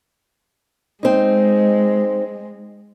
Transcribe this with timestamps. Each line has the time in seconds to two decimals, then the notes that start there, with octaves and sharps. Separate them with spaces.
1.03 G#3 C4 D#4